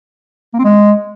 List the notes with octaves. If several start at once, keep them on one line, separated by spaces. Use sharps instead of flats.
A#3
C4
G#3